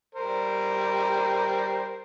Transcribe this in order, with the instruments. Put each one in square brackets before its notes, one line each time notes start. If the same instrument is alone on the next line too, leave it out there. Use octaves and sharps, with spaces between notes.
[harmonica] G3 A#4 C5